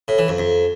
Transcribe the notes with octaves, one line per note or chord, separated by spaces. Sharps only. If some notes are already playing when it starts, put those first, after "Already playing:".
A2
E3
F2
F2